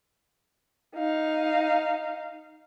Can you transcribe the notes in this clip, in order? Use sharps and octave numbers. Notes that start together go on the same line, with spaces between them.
D#4 F5